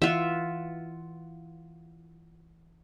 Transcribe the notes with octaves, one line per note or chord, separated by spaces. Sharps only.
E3 F4 E5 F#5